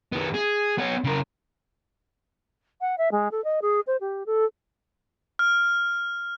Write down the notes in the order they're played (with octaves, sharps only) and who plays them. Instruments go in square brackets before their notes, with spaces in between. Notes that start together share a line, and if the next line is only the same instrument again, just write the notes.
[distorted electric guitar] D#3 B3
G#4
B3 C#5
C#3 A#4
[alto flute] F#5
E5
G#3
A4
D#5
G#4
C5
G4
A4
[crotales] F6